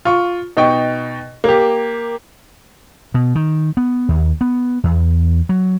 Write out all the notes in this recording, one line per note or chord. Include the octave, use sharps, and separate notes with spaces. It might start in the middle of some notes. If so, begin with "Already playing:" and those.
F4 C#6
B2 D#4 G5 C#6
A#3 G4
B2
D#3
B3
D#2
B3
E2
F#3